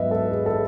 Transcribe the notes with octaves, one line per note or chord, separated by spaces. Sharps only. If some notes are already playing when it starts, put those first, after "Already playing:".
Already playing: G#2 F#3 B3 B4 D#5 E5
A4
G#4
A4